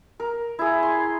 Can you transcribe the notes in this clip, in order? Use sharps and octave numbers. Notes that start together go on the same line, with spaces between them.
A#4
E4 G#4
C6